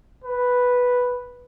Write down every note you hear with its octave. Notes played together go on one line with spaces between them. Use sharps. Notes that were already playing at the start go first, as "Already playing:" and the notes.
B4